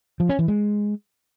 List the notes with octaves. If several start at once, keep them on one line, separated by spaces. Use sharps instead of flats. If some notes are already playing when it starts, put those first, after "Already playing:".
F3
C#4
E3
G#3